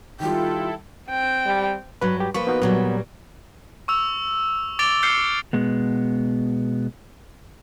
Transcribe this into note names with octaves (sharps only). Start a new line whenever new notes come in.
D#3 G3 E4 F4 A4 G5
C4 G5
G3
G2 F#3 B4
G4
F3 A#3 B4 C#6
B3 D#4 F#4
A#2 F#3 G3 B3
C#6 E6 F7
D6 A6 D7 F7 G7
F6 G6 C7 C#7 G7
B2 G#3 B3